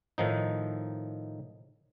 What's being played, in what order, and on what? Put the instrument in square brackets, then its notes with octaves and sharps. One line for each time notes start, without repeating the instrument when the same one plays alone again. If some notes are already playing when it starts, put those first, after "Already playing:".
[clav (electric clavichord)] A2 D#3 F3 D#4